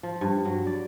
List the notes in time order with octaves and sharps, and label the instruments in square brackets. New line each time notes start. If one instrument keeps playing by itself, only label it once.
[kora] F3
G2
F#3
D5